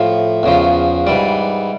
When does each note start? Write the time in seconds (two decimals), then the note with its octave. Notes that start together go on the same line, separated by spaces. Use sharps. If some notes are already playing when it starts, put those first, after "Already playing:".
Already playing: A2 F3
0.43 E2 C#3 F3
1.06 G#2 E3 G3 D5